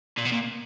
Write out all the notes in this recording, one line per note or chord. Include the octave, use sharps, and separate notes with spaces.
A#2
B2
A#2